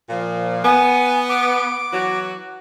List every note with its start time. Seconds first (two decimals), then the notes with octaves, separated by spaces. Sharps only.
0.09 A#2 F3
0.64 B3 G#5
1.29 D6
1.93 E3 F#3 F#4